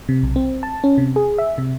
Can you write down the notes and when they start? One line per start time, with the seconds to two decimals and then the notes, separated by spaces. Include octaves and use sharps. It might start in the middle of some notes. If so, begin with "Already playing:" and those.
0.09 C3
0.23 B1
0.36 C4
0.63 A5
0.84 C#4
0.98 C3
1.16 G#4
1.38 E5
1.58 C3